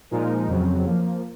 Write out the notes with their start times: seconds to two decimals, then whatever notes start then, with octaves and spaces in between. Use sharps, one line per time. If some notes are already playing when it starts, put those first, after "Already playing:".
0.11 A#2 F3 G#3 D#4 A#4
0.47 F2 C#3 F#3 C4
0.85 F3 A#3